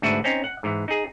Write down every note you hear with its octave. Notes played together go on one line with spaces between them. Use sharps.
D2 G#2 D4 F#4 B4 E5
C4 C#4 D#4
F#5
G#2 E3
D#4 G#4